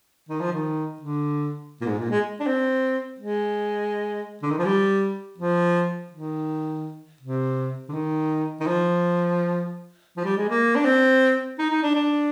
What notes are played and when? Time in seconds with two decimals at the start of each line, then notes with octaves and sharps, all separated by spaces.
0.29 D#3
0.41 F3
0.52 D#3
1.01 D3
1.81 A#2
1.86 G#2
1.98 A#2
2.11 G#3
2.40 D4
2.47 C4
3.20 G#3
4.43 D3
4.51 D#3
4.58 F3
4.65 G3
5.38 F3
6.12 D#3
7.21 C3
7.89 D3
7.94 D#3
8.60 D#3
8.67 F3
10.17 F3
10.24 G3
10.37 G#3
10.49 A#3
10.76 D4
10.85 C4
11.59 D#4
11.70 D#4
11.83 D4
11.95 D4